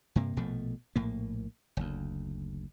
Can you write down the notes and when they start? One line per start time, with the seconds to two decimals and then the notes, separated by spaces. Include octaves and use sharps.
0.16 G2 C3 A#3
0.36 A#1 B2 F3 A3
0.96 A#1 A2 A#3
1.77 F#1 D2